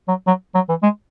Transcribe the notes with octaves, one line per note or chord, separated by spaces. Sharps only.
F#3
F#3
F#3
E3
G#3